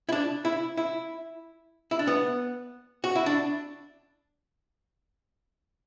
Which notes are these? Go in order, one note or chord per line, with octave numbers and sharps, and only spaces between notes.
E4
D4
E4
E4
E4
D4
B3
F#4
E4
D4